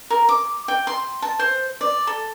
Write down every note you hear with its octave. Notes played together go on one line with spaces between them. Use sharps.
A#4
D6
G5
C6
A5
C5
D5
A4